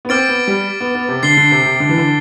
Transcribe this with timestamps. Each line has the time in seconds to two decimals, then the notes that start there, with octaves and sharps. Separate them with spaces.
0.05 B3
0.09 C4 D6 F6 A6 D7
0.28 B3
0.47 G3
0.80 B3
0.95 B3
1.08 C3
1.23 D3 A6 C7 G7
1.37 D3
1.51 C3
1.66 C3
1.80 D3
1.89 E3
1.98 D3